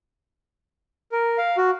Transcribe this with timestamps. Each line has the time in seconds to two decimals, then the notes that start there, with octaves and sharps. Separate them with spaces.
1.12 A#4
1.38 F5
1.57 F#4